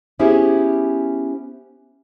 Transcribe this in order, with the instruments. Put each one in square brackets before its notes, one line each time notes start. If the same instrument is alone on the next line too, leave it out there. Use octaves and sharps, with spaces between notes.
[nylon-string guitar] B3 C#4 E4 G4 G#4 C5